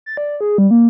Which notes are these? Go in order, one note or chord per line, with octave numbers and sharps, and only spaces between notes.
A6
D5
G#4
G3
A#3